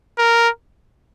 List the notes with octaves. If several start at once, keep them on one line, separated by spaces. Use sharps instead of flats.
A#4